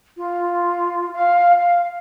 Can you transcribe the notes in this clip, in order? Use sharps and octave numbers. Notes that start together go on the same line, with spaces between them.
F4
F5
F5